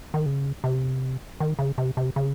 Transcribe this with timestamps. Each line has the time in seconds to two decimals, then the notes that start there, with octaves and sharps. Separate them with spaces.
0.14 D#3
0.26 C#3
0.64 C3
1.40 D#3
1.59 C#3
1.78 C3
1.97 C3
2.16 C#3